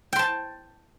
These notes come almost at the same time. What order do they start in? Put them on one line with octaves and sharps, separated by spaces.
G5 C6 A5